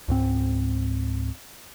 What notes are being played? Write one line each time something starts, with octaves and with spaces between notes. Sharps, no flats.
C#2 G#2 C4